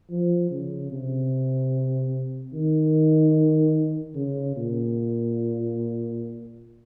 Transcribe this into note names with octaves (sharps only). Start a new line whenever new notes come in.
F3
C#3
C3
D#3
C#3
A#2